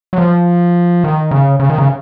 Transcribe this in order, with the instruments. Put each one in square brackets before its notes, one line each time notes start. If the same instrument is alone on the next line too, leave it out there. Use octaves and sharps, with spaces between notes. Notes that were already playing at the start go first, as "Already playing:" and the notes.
[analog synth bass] F#3
F3
D#3
C#3
C#3
D#3
C#3